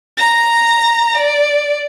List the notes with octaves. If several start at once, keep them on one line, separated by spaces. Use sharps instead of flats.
A#5 A#6
D5